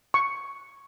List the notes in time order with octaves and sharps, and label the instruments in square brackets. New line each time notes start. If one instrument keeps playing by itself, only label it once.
[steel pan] C#6